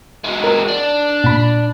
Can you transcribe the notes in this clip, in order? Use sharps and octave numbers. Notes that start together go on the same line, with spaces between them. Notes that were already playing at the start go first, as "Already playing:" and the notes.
G#3 F#4
A#4
D4
A#2 B5